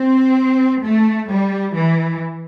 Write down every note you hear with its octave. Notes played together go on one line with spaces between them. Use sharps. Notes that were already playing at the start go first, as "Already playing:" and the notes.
Already playing: C4
A3
G3
E3